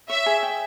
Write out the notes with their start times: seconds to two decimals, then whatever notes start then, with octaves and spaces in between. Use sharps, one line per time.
0.10 C#5 E5
0.26 G#4
0.43 G5